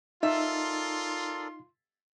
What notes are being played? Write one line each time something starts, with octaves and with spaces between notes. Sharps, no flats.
D#4 F4 A4 A#4 D5 E5 C6